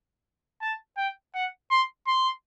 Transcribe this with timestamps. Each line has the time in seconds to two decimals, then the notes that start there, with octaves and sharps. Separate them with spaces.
0.62 A5
0.97 G5
1.34 F#5
1.71 C6
2.07 C6